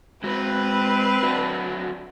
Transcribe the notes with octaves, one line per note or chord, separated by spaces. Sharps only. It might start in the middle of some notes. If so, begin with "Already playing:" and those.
G#3 C4 F#4 B4
F#3 D4 F#4